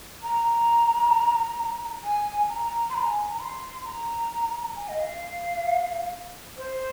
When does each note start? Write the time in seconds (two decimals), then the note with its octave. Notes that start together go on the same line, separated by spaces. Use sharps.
0.23 A#5
2.04 G#5
2.49 A#5
2.64 A#5
2.90 C6
2.94 A#5
3.06 G#5
3.29 A#5
3.40 C6
3.85 A#5
4.76 G#5
4.89 D#5
4.99 F5
6.57 C5